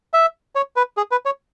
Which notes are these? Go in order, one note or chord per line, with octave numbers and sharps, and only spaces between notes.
E5
C#5
B4
G#4
B4
C#5